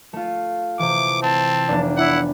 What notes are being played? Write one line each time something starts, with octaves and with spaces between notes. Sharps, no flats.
A3 F4
C3 E3 D6
C4 A5
F1 B3 D4
E4 F#5 B5